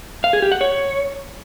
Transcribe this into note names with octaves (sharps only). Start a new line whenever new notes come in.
F5
G#4
G4
F#5
C#5